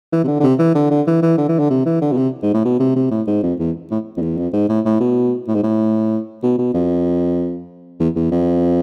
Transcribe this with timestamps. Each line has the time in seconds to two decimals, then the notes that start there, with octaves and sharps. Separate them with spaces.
0.13 E3
0.24 C3
0.27 D3
0.40 D3
0.43 C3
0.59 E3
0.75 D3
0.91 D3
1.07 E3
1.22 E3
1.38 D3
1.49 E3
1.59 D3
1.70 C3
1.86 E3
2.01 D3
2.12 B2
2.17 C3
2.43 G#2
2.54 A2
2.65 B2
2.79 C3
2.95 C3
3.11 A2
3.27 G#2
3.43 F2
3.59 E2
3.91 A2
4.17 F2
4.22 E2
4.37 F2
4.53 G#2
4.69 A2
4.85 A2
5.00 B2
5.48 A2
5.55 G#2
5.63 A2
6.43 B2
6.58 B2
6.74 F2
8.00 E2
8.16 E2
8.31 F2